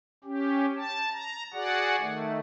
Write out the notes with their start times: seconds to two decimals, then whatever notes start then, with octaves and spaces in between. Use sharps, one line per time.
0.24 C#4 G4
0.76 A5
1.13 A#5
1.53 F#4 G#4 D5 F#5
2.00 D#3 A3